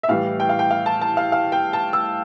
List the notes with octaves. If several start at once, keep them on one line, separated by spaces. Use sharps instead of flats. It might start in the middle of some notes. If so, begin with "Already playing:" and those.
E5
A2 E3 G3 F5
G5
F5
G5
F5
A5
A5
F5
F5
G5
A5
E6